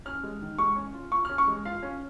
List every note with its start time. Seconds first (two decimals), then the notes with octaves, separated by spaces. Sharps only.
0.05 C#4 F6
0.23 G#3
0.41 D#3
0.59 G#3 C#6
0.76 C#4
0.94 F4
1.11 F4 C#6
1.25 F6
1.29 C#4
1.38 C#6
1.48 G#3
1.65 F4 F5
1.83 C#4